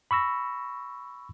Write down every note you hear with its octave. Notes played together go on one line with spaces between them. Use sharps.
B5 C#6 E6 A#6